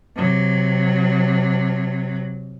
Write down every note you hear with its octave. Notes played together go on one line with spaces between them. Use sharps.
C3 F#3